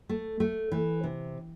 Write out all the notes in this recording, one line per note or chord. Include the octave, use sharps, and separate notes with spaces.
A3
A3
E3
C3